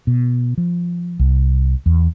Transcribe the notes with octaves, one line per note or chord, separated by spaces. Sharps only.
B2
F3
C2
E2